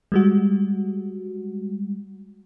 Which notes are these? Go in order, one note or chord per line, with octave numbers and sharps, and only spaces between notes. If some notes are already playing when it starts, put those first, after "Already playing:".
G3 G#3 F#4